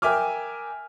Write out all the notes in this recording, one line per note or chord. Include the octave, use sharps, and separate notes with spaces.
A#4 E5 G5 G#5 D6 F6